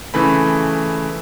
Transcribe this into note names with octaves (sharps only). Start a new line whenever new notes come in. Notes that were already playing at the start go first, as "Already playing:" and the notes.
C#3 E3 A3 B5